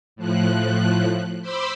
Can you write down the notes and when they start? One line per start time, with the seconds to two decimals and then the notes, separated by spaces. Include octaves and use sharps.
0.16 A2 F3 F#6
1.42 C5 B5 C6 D6 E6